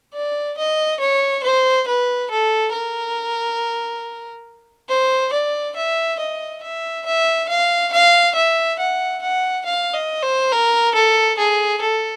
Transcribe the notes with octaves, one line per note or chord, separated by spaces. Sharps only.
D5
D#5
C#5
C5
B4
A4
A#4
C5
D5
E5
D#5
E5
E5
F5
F5
E5
F#5
F#5
F5
D#5
C5
A#4
A4
G#4
A4